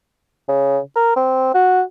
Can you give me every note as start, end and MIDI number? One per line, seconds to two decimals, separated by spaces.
0.48 0.79 49
0.96 1.13 70
1.16 1.49 60
1.54 1.81 66